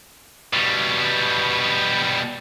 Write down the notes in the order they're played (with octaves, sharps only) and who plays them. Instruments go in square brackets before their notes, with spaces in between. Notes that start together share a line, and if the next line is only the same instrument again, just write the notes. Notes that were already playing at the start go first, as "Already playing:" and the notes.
[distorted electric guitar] B2 G3